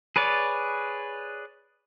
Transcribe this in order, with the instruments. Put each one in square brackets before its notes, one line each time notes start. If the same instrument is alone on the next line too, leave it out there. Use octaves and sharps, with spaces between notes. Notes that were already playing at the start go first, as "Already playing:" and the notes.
[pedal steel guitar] G#4 B4 C#5 D5